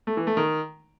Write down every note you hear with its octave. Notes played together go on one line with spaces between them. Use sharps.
A3
E3
A3
D#3